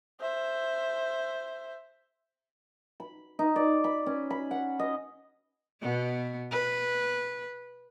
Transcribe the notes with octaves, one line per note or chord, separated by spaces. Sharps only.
C5 E5
B5
D#4
D5
B5
C#4
B5
F#5
D#5
B2 B3
B4